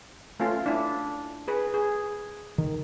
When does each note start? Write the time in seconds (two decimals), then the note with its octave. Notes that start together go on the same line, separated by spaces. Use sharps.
0.40 A3 C#4 F4
0.66 D4 E4
1.48 G#4 B4
1.74 G#4
2.58 D#3